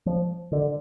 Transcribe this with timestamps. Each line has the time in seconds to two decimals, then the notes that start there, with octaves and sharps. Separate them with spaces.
0.06 F3
0.52 D3